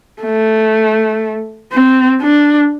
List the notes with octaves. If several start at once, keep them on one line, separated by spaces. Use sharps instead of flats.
A3
C4
D4